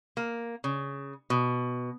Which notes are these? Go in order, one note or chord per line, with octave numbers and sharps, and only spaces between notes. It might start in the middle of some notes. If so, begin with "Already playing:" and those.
A#3
C#3
B2